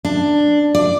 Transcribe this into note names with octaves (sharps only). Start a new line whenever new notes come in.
D4
D5